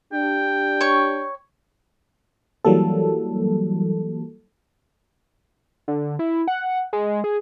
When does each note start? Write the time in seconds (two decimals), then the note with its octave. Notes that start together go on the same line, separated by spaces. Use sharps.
0.13 D4 G4 G5
0.81 C#5 C#6
2.65 E3 F#3 G3 A#3 A4
5.88 D3
6.19 E4
6.48 F#5
6.93 G#3
7.24 G#4